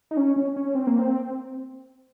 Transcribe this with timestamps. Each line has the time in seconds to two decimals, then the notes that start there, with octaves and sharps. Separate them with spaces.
0.11 D#4
0.17 C#4
0.36 C#4
0.56 C#4
0.75 C4
0.87 A#3
0.99 C4